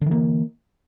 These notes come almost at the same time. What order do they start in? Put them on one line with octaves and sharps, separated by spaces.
D3 E3 A#3